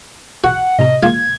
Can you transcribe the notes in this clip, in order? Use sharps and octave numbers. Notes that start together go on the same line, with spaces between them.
F#4 F#5
A2 C3 D#5 A#5
G#3 A#3 F4 G#6